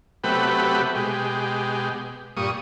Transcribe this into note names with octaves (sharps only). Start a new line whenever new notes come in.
C3 F#3 A3 B3 G4 B4
B2 G#3 G4
G2 A#2 C#6 D#6